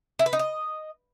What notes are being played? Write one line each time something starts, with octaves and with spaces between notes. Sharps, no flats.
E4
B4
D#4
D#5